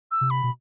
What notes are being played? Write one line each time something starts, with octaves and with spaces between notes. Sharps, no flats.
E6
C3
B5
B2